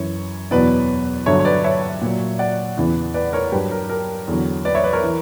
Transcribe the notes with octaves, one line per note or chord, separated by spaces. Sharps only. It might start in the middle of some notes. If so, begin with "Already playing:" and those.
Already playing: F#2 E3 C#5
E2 B2 F#3 B4 D5
G2 D3 F#3 C#5 E5
C#5
B4 D5
C#5 E5
A#2
F#3
D5 F#5
E2 C#3 E3
B4 D5
A#4 C#5
G2 F#3 G4 B4
A#4
A#4
E2 D3 F#3
B4 D5
C#5 E5
B4 D5
A#4 C#5
E3